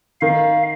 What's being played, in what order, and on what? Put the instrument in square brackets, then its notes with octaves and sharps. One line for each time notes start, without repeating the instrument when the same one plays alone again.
[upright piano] D#3 [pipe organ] F5